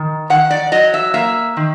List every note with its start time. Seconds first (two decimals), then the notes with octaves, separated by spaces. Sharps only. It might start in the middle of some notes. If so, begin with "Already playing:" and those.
Already playing: D#3
0.30 D#3 F#5
0.50 D5
0.72 F#3 D#5
0.94 E5
1.14 A#3 E5
1.57 D#3